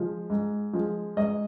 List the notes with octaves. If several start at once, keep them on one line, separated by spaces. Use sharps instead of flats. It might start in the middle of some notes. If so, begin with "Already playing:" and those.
Already playing: F3 G#3
G#2
F3 G#3
G#2 D#5